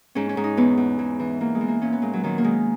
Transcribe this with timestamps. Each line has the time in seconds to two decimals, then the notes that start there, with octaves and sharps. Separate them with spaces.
0.15 G#2 C#4
0.29 C#4
0.37 G#2
0.44 D#4
0.57 E2 B3
0.77 E2
0.99 G#2
1.20 E3
1.40 E2 A#3
1.55 G#3
1.61 E3
1.68 A#3
1.82 A#2 C#4
1.92 B3
2.02 A#2 G#3
2.13 F#3
2.23 D#3 F#3
2.38 A#3
2.44 D#3 G#3